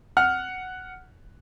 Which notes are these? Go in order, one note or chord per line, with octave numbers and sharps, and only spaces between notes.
F#5 F6